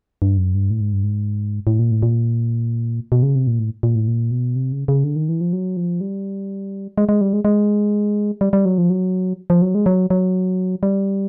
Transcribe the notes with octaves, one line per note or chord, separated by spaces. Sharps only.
G2
F#2
G2
A2
G#2
G2
G#2
A2
A#2
A2
A#2
B2
C#3
C3
A#2
A2
A#2
A2
A#2
B2
C3
C#3
C#3
D3
D#3
E3
F3
F#3
F3
G3
G#3
G#3
G3
G#3
G#3
G3
G3
F#3
F3
F#3
F3
F#3
G#3
F#3
F#3
G3